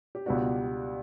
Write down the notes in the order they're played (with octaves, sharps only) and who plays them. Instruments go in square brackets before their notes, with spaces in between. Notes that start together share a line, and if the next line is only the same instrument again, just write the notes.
[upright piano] G4
C#2 B2 G3 B3 D4 F#4